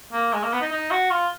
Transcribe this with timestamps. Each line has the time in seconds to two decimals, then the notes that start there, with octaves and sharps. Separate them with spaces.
0.13 A#3
0.33 G#3
0.43 A#3
0.53 B3
0.62 D#4
0.72 D#4
0.91 F#4
1.10 F4